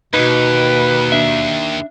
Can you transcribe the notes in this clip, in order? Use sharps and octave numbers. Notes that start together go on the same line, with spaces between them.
D#2 B2 D#4 B4
D4 E5